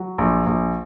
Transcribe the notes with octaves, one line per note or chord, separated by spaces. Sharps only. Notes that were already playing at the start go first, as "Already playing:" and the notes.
Already playing: F#3
A#1
A#1